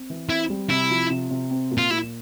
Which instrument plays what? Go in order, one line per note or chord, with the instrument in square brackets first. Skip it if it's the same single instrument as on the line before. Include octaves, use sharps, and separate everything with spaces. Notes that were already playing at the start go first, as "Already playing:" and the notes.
Already playing: [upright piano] C4
E3
[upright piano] C4 [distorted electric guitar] E4
[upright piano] G3
[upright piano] C3 [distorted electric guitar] E4
[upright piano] F3
C3
C3
C4
A#2
[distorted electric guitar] F4
[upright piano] A#2 [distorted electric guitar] E4